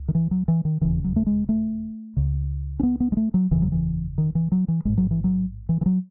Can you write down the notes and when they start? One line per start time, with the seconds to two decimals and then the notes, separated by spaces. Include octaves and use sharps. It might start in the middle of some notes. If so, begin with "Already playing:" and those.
Already playing: C#2
0.08 D#3
0.15 E3
0.31 F#3
0.48 E3
0.65 D#3
0.81 E1 D#2 C#3 E3
1.04 F#3
1.16 A3
1.27 G#3
1.49 A3
2.17 C#2 C#3
2.80 C#4
2.83 B3
3.00 B3
3.12 G#3
3.17 A3
3.34 F#3
3.51 F#1 E2 C#3 E3
3.62 F#3
3.72 E3
4.18 D#3
4.35 E3
4.52 F#3
4.68 E3
4.85 A1 G#2 G#3
4.98 F#3
5.11 E3
5.24 F#3
5.69 E3
5.81 E3
5.86 F#3